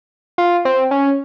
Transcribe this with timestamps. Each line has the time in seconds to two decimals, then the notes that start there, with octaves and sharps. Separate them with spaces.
0.38 F4
0.65 C4
0.91 C#4